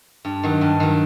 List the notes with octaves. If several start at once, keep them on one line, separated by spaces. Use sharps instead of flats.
G2
D#3 F#3
G2
D#3 F#3